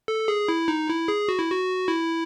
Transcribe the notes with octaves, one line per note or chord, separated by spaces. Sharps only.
A4
G#4
E4
D#4
E4
G#4
F#4
E4
F#4
E4